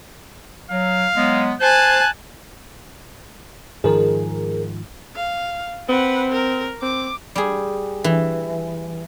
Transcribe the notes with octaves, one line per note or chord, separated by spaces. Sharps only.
F#3 F5
F#3 G#3 B3
C5 G#5 A5 F#6
G#2 D#3 F3 G#4 A#4
F5
C4 B4 F#5
A#4
C4 D6
G3 G#4
E3